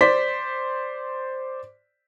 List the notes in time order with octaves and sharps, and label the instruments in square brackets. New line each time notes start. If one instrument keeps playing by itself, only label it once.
[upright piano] C5 D5 B6